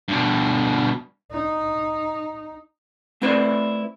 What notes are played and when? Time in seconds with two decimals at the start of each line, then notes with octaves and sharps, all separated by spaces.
0.08 G2 B2
1.32 D#4
3.22 A3 C4 E4 B4 C5 D5